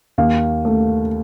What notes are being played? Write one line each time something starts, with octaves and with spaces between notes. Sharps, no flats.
D#2 F5
A3